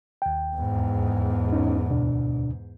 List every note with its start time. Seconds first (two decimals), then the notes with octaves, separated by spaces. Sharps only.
0.22 D#2 G5
0.56 E2 G#2
1.52 C#4 D#4
1.90 D2 B2 D4